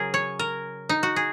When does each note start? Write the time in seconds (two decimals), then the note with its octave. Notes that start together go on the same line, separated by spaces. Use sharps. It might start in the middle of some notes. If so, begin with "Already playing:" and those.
Already playing: C#3 F#3 G#4 A#4
0.14 C#5
0.39 A#4
0.89 D#4
1.03 F#4
1.16 G#4